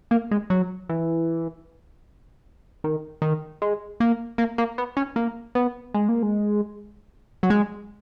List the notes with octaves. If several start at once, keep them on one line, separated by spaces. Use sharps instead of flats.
A#3
G#3
F#3
E3
D#3
D#3
G#3
A#3
A#3
A#3
B3
C#4
A#3
B3
G#3
A#3
G#3
F#3
G#3